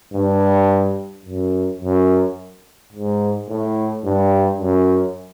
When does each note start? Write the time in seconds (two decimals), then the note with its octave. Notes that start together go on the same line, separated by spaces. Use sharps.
0.13 G2
1.25 F#2
1.81 F#2
2.93 G#2
3.49 A2
4.04 G2
4.60 F#2